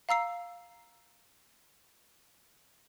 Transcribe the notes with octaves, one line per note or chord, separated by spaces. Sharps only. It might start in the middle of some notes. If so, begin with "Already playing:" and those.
F5 A#5 E6 C7